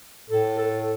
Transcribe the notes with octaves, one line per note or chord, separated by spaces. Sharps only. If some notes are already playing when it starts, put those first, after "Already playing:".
A2 A4
A4